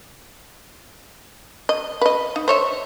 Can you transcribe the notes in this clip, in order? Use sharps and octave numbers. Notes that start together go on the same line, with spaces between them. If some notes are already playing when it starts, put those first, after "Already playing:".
D#5
B4 D#5
D#4
C5 C#5 E5